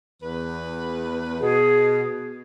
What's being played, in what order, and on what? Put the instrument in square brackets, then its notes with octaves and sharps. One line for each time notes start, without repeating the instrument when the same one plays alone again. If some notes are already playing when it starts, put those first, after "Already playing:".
[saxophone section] E2 B4
[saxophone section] B2 [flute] G#4